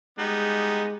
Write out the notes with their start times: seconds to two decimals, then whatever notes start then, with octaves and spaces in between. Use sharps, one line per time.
0.19 G3 G#3 B3 D#4